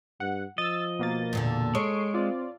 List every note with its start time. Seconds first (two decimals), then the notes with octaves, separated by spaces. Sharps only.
0.20 G2 F#5
0.58 F3 D#5 E6 A6
0.99 B2 A#3 A6
1.33 E2 A#2 D3
1.75 G#3 A4 C#5 C#6 C7 D7
2.14 C4 F4 D5